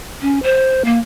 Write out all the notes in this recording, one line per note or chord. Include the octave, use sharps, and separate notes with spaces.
C#4
C5
A#3